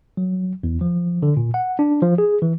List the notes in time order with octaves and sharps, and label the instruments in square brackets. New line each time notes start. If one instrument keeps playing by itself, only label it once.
[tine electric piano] F#3
E2
F3
D3
A#2
F#5
D4
F3
G#4
E3